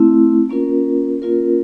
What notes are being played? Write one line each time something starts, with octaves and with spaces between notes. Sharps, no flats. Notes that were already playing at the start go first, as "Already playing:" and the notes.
Already playing: A3 C4 E4
A#3 C#4 F4 A#4
A#3 C#4 F4 A#4